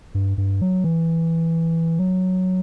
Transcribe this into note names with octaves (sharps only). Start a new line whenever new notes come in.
G2
G2
F#3
E3
F#3